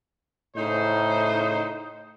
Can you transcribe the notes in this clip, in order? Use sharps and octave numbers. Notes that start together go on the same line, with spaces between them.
A2 C#3 D#4 C5